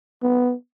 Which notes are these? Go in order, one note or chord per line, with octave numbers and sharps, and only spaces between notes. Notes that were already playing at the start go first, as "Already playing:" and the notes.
B3